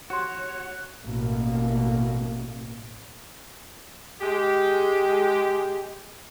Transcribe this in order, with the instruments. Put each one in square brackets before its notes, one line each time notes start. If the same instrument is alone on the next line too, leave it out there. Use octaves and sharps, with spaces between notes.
[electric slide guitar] F#4 [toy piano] G4 C6 [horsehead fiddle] C#5 [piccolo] F#6
[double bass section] A1 B2 A#3
[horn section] G#3 G4